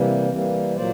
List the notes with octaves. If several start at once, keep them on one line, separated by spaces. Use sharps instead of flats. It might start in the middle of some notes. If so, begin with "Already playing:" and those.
Already playing: C3 E3 G3 A#3
E3 G3 A#3
A#2 F#3 A#3 C5 D5